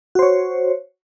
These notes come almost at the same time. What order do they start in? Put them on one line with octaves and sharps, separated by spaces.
F#4 C5 C#5